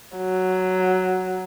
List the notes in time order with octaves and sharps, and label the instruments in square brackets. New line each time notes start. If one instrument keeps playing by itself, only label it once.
[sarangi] F#3